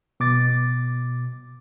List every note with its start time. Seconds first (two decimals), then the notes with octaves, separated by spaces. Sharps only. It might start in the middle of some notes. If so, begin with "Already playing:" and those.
0.20 B2 D6 A6